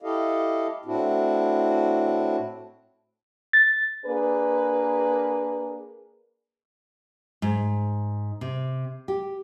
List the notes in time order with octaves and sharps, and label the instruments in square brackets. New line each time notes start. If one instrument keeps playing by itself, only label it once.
[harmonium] E4 G4 A4 D#5 F5
A2 C4 D4 E4 F#4
[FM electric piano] A6
[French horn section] A#3 D4 G#4 A#4 B4
[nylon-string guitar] G#2
C3
G4